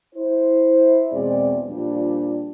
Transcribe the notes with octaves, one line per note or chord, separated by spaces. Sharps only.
E4 C5
E2 B2 G#3 C4 G#4 D5
A#2 F3 G3 D4